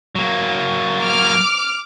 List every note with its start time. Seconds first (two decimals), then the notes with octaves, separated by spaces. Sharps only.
0.15 F#3 A#3
1.00 D6 F6